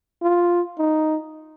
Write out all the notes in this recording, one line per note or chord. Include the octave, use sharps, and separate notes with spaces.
F4
D#4